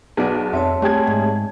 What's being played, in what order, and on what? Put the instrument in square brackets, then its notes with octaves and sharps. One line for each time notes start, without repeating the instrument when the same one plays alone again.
[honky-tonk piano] B1 B3 [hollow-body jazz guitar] G#4 D5
[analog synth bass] F2 [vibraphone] C4 C#5 A5 [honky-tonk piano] E5
[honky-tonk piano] G3 G#4 G#6 [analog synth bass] A3
[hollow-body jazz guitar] G#2